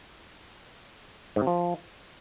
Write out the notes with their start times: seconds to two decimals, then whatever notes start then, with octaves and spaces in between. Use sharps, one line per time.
1.36 G#2
1.42 C3
1.47 F3